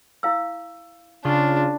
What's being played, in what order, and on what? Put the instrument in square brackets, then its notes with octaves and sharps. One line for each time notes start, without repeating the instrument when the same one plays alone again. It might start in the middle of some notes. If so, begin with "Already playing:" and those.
[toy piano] E4 F5 E6
[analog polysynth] C#3 F4 [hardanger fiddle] D4 [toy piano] C#6